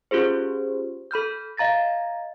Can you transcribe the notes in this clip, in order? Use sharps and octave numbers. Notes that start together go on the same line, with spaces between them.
C#4 F4 G4 G#4 C5
A4 B5 F6 G6
D#5 F5 A#5 A6 A#6